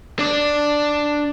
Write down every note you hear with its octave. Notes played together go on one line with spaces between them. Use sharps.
D4 D5